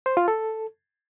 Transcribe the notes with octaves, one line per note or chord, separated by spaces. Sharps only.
C5
F4
A4